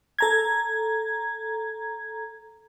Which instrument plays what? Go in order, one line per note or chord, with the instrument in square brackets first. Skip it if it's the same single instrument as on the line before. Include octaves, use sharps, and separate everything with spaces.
[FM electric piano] A4 A#5 G#6